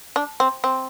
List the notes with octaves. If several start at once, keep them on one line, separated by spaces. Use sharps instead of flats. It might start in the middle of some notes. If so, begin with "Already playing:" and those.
D4
C4
C4